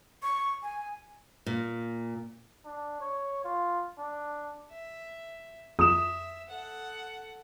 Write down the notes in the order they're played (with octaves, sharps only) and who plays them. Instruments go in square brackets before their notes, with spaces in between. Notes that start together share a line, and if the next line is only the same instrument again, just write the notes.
[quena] C#6
G#5
[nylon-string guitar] A#2
[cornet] D4
C#5
F4
D4
[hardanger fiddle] E5
[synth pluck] F2 [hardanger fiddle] E5 [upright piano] D#6 E7
[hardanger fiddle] A4 F#5